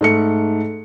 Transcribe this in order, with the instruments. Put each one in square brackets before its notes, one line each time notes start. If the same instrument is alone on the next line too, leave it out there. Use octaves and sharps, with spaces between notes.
[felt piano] G#2 A3 C#7